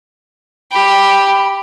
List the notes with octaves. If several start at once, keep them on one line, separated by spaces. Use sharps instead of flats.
G4 B5